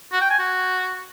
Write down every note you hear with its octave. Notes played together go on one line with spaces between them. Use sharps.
F#4
G5
G#5
F#4